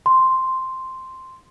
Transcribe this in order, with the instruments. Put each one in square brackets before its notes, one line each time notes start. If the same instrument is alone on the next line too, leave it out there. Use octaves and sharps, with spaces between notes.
[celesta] C6